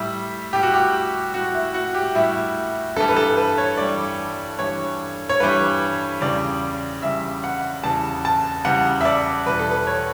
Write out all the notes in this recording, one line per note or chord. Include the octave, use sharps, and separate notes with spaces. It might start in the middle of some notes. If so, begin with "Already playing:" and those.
Already playing: A2 G3 E5
A2 G3 G4
F#4
G4
A2 G3 F#4
E4
F#4
G4
A2 G3 E4
G2 E3 G3 A4
B4
A4
B4
C#5
G2 E3 G3 D5
G2 E3 G3 C#5
C#5
G2 E3 G3 B4
E2 C#3 G3 D5
E2 C#3 G3 E5
F#5
E2 C#3 G3 A5
A5
E2 C#3 G3 F#5
E5
D5
E2 B2 G3 B4
A4
B4
C#5